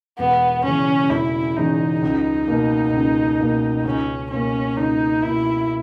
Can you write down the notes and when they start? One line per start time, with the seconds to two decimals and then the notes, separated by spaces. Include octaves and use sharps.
0.18 E1 B3
0.64 E2 C#3 C#4
1.10 E1 E4
1.56 E2 C#3 D#4
2.02 C#2
2.48 B2 A#3
2.93 C#2
3.40 B2 A#3
3.85 C#2 C#4
4.31 B2 A#3 C#4
4.77 C#2 D#4
5.23 B2 A#3 E4